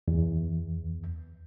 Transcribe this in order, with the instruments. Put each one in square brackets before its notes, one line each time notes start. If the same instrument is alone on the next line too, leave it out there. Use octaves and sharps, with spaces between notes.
[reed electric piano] E2